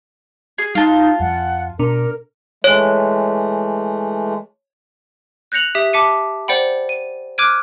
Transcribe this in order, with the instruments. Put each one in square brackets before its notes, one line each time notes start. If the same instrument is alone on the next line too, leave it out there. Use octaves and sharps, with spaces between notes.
[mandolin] G#4
[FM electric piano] G3 [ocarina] D#4 [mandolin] F4 A5
[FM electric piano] F2 [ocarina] F#5
[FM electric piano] B2 D4 [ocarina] A#4
[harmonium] E3 G#3 A3 [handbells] C#5
[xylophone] F#6 G6 A#6 C#7 F7 F#7
G4 E5 D#6 B6
A5 D6 B6 C#7 D#7
C5 D5 F#5 G5 B5
D#7
D6 F6 F#6 G#6 D7 D#7